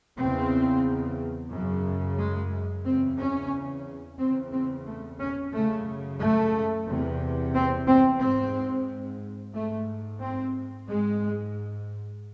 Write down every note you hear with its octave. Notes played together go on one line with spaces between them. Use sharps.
E2 C#3 C4
F#2 C#3
G#3
E2 C#3 C4
C#4
E2 C#3 C4
C4
A3
C#4
F#2 C#3 A3
A3
E2 C3
C4
C4
G#2 C4
G#2 A3
C4
G#2 G#3